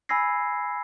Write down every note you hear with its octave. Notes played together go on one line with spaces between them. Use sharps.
G#5 B5 E6 G#6 A#6 C7